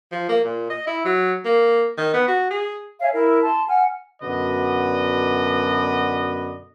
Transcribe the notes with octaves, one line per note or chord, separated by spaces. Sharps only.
F3
A#3
A#2
D#5
E4
F#3
A#3
D#3
B3
F#4
G#4
C#5 E5 F5 G#5
E4 A#4
A5 C6
F#5 G#5 F6
F#2 B2 D3 B4 D5 D#5